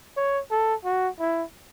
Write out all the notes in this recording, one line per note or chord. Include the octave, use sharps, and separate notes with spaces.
C#5
A4
F#4
E4